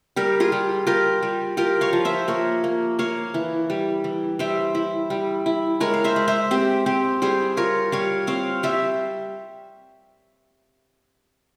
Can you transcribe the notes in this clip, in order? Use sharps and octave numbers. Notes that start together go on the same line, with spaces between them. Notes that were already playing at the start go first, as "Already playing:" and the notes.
G3 G4 A#4
F4 G#4
G3
F4 G4 A#4
G3
F4 G4 A#4
C#5 F5
F3
C5 E5
A#3 A#4 C#5
A#3
A#3 C#5 F5
E3
G3
E3
G3 C5 E5
E4
G3
E4
G#3 A#4 C#5
F5
C5 E5
G#3
C5 E5
C4 G4
C4 G4
G3 G#4 C5
F4 A#4 C#5
G3 C#5 F5
C4 C#5 F5
G3 C5 E5